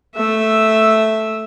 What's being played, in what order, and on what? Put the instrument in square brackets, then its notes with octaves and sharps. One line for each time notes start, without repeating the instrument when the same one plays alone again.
[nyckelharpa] A3 E5